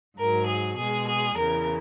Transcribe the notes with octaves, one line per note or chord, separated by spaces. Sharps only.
G#2 F#3 A#4
G#4
B2 G#3 G#4
G#4
E2 C#3 E3 A#4